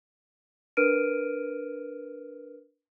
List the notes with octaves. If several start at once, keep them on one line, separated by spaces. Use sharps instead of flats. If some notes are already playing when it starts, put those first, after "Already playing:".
D4 A#4 B4 F6 D7 D#7